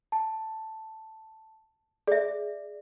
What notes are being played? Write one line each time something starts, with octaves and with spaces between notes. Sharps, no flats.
A5
G#4 D5 E5